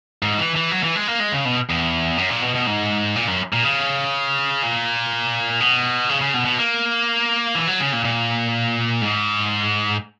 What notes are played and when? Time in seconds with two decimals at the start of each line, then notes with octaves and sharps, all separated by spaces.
0.23 G#2
0.39 E3
0.56 E3
0.71 F#3
0.83 E3
0.96 G#3
1.08 A#3
1.20 G#3
1.32 C#3
1.45 B2
1.70 E2
2.17 F#2
2.30 A#2
2.42 B2
2.54 B2
2.67 G#2
3.16 A#2
3.28 F#2
3.53 A#2
3.64 C#3
4.63 A#2
5.61 B2
6.09 C#3
6.21 C#3
6.34 B2
6.45 B2
6.58 A#3
7.55 E3
7.67 F#3
7.80 C#3
7.93 A#2
8.05 A#2
9.02 G#2